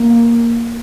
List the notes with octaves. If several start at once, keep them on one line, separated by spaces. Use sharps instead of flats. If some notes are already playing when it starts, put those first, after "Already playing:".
Already playing: A#3